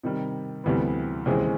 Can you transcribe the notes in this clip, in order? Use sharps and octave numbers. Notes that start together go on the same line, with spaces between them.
C3 D#3 G3
D2 C3 E3 G3 B3
D#2 C#3 E3 G#3 C4